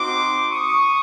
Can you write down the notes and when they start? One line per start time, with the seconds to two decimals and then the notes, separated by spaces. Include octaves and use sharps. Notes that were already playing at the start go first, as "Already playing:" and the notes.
Already playing: C4 D#4 F#4 C6 D6
0.51 C#6 D#6